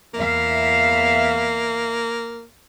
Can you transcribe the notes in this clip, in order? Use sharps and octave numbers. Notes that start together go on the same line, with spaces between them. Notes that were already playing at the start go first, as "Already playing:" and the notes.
E2 A#3 E5 F5